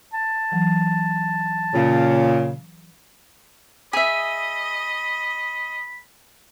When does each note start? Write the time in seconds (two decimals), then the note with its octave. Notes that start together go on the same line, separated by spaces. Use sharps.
0.14 A5
0.52 E3 F#3
1.74 A#2 C#3
3.93 G#4 D#5 E5 B5